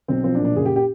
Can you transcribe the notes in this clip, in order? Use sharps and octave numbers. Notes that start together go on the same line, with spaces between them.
B1 C4
F3 C4
D4
A#2
D4
F#1 G#4
G4
G4